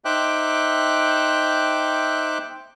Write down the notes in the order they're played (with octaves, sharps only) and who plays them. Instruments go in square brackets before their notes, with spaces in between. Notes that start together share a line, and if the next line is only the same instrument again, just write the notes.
[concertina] D#4 C5 E5 G5 D6 F#6